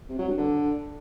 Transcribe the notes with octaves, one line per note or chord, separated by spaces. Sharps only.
C3
F#3
G2
D3